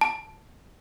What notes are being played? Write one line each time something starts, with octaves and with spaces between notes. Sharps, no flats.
A5